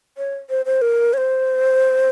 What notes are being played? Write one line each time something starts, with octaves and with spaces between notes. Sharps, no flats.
C#5
C5
C5
A#4
C#5
C5